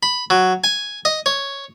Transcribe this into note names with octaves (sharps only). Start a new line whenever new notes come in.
B5
F#3
G#5
D#5
C#5